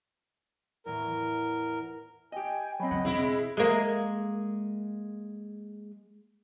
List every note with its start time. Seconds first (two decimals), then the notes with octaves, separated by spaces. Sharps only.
0.86 E2 A2 E3 A#4
2.32 G4 D#5 G5 G#5
2.80 F#3 C4 C#5 D#5 B5
2.91 C#3 F#3 F#5
3.05 E1 G#3 C4 E4
3.57 G#3 A#3